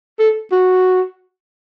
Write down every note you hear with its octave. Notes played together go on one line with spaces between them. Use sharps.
A4
F#4